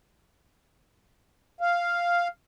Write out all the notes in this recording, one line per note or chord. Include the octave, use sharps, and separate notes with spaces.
F5